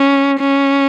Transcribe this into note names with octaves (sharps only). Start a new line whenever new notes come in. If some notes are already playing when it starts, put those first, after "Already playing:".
Already playing: C#4
C#4